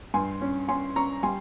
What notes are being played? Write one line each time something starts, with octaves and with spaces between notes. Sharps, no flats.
G2 G#5 C6
C#4
C#4 G#5 C6
C#4 A#5 C#6
G3 G#5 C6